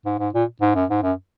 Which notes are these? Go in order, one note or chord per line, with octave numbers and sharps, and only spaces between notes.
G#2
G#2
A#2
G#2
F#2
G#2
F#2